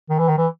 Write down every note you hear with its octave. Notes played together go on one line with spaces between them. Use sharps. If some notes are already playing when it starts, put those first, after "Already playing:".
D#3
E3
D#3
E3